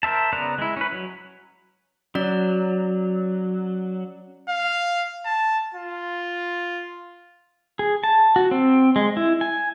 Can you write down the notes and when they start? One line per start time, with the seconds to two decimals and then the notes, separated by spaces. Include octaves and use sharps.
0.03 A#4 C5 E5 A5
0.33 C#3 B3 D5 A#5 F#6
0.58 G#3 E4
0.77 C#4 B4
0.92 F#3
2.15 F#3 C#4 D5
4.49 F5
5.25 A5
5.75 F4
7.79 G#4
8.04 A5
8.36 F#4
8.51 C4
8.96 G#3
9.17 E4
9.41 G#5